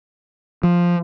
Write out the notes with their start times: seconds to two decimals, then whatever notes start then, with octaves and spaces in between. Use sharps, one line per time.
0.63 F3